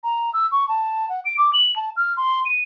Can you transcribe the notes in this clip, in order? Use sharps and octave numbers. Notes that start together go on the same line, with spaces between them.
A#5
E6
C#6
A5
F#5
D7
D6
F#7
A5
F6
C6
D#7